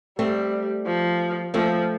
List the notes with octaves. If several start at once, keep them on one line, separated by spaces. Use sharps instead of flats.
G3 A3 C4
F3
F3 A3 C4